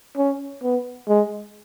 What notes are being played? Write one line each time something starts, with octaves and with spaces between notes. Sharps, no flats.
C#4
B3
G#3